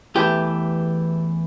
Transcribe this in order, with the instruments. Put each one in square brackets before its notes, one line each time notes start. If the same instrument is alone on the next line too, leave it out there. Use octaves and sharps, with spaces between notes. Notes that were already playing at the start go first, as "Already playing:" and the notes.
[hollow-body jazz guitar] E2 E3 A3 G4